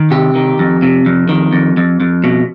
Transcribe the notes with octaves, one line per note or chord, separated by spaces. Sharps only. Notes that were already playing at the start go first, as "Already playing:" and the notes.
Already playing: D#3
C3 G4
D#3
F2
C3
F2
D#3
F2
F2
F2
B2